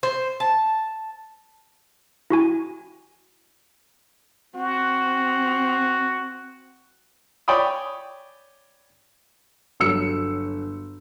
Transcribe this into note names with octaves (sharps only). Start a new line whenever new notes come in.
C5
A5
E4 F#4 G#5
C4 F#4
C#5 D5 G5 G#5 B5 D#6
G1 F#3 E6 C#7